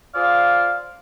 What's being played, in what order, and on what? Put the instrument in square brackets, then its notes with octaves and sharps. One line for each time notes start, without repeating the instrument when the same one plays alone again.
[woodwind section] F4 G#4 C5 D5 F5